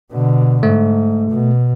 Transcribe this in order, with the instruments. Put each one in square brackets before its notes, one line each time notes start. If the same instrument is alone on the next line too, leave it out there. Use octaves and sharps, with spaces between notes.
[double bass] B2 D3
[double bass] G#2 [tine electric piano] A3
[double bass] B2